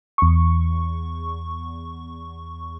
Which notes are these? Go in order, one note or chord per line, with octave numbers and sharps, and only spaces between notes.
E2 C#6